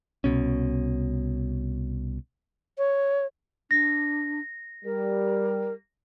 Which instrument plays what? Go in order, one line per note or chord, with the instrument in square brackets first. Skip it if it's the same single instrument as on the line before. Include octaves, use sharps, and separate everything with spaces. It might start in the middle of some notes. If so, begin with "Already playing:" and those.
[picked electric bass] C2 B2 C#4
[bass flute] C#5
[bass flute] D4 [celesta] A#6
[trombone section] G3 [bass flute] A#4